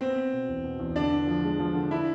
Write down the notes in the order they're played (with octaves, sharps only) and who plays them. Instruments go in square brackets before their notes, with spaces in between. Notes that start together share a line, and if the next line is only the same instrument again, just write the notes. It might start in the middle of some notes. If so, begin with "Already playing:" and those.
[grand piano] B3 [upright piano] C4
[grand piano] B3
B2
E2
B2
E2
[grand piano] D3 [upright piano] D4
[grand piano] D3
F3
G#3
F3
D3
[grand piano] D4 [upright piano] E4